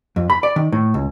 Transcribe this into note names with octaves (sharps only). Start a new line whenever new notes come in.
F2
B5
D5
D#3
A2
C#2